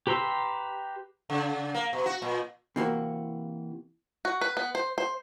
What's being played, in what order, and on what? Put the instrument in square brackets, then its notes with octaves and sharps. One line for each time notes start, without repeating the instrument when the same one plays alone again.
[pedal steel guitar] G4 B4 A#5 C6 E6
[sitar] C#3
A#3
B2
F#4
A#2
[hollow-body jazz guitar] C3 E3 A#3 F#4
[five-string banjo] F#4
B4
B3
C5
C5